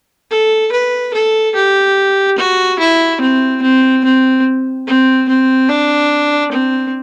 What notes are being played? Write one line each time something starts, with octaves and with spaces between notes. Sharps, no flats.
A4
B4
A4
G4
F#4
E4
C4
C4
C4
C4
C4
D4
C4